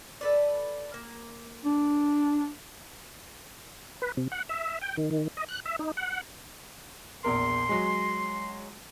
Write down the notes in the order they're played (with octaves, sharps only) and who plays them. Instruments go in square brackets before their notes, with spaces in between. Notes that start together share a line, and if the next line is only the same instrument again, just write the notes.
[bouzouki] A4 B4 D5
A#3
[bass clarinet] D4
[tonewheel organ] B4
C3
F#5
E5
G5
D#3
D#3
D#5
F#6
E5
D#4
F#5
[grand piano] A#1 E2 A#4 [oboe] C6
[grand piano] F#3 G#3